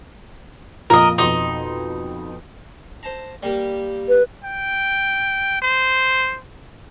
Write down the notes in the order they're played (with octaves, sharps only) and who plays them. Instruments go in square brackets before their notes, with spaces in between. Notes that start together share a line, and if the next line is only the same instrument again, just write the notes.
[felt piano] F2 A#2 F3 [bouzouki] A#4 D#5
[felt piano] F2 B2 C6 [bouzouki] D#4
[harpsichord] C5 A5 A#5
G3 A#3 G4
[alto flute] B4
[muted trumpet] G5
C5